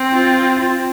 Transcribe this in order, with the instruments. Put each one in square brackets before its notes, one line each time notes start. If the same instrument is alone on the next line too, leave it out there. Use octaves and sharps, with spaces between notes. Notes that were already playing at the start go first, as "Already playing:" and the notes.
Already playing: [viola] C4
[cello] F4